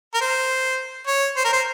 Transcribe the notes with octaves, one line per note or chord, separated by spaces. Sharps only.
A#4
C5
C#5
C5
A#4
C5